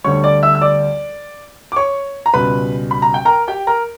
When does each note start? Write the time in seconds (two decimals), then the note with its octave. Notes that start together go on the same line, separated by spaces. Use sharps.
0.04 D2 D3 G3 C#5 C#6
0.24 D5 D6
0.43 E5 E6
0.55 E6
0.61 D5 D6
1.72 D6
1.76 C#5 C#6
2.26 A#5
2.34 C#2 B2 G3 B4 B5
2.91 B5
3.02 A#5
3.14 G5
3.25 A#4 A#5
3.48 G4 G5
3.67 A#4 A#5